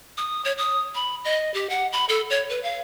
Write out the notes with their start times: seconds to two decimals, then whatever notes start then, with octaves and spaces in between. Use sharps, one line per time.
0.17 D#6
0.45 C#5
0.58 D#6
0.95 B5
1.25 D#5
1.54 G4
1.70 F#5
1.93 B5
2.09 A4
2.30 C#5
2.49 B4
2.63 F5